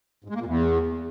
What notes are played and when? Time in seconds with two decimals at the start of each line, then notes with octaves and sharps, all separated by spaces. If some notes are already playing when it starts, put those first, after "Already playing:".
0.24 G#2
0.30 G#3
0.35 A#3
0.40 A#2
0.46 E2